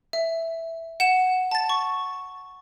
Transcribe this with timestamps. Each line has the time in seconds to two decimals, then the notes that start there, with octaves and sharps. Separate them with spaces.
0.13 E5
1.00 F#5 E7
1.51 A5 A6
1.69 C#6